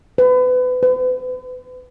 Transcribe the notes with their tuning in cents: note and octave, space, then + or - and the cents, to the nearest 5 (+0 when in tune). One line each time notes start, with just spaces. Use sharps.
B4 +30
B4 +45